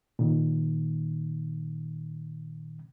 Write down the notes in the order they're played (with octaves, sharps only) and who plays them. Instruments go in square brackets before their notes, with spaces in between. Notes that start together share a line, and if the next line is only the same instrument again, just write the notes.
[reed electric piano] A#2 D#3